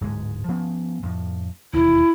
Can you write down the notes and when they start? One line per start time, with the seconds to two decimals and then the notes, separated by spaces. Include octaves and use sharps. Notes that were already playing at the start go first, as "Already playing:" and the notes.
0.01 D1 G#2 G#3
0.48 F3 B3 C#4
1.03 F2 A2
1.73 E1 D#2 E4